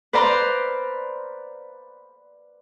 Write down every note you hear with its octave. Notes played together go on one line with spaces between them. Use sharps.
B4 C5 D5 F5 A#5 C6